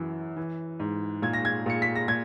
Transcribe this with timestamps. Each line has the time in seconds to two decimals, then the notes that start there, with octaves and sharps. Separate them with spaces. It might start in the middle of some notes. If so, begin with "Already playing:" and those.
Already playing: F#2 E3
0.37 E3
0.80 G#2
1.22 A#2 G#6
1.33 A#6
1.45 G#6
1.66 A#2 C#7
1.82 B6
1.96 A#6
2.08 A#2 G#6